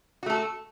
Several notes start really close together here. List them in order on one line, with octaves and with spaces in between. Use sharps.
F#4 A3 A4